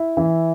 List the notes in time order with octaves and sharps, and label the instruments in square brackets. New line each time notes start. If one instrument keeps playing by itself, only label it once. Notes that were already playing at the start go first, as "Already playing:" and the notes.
Already playing: [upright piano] E4
E3